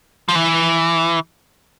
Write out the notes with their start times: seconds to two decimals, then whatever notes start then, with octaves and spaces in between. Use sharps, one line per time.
0.29 F3
0.35 E3